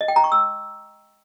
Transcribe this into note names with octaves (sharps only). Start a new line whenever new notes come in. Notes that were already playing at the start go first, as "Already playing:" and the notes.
D#5
G5
A#5
C#6
E6